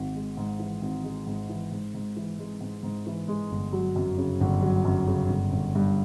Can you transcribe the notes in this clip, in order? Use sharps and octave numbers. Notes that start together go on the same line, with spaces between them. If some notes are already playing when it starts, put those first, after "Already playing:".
Already playing: G#1
G#3
G#2
E3
G#1
G#3
G#2
E3
G#2
G#2
E3
G#3
G#2
G#2
E3
G#3
G1
F#3
F#2
C#3
G1
F#3
F#2
C#3
G1
G1
G2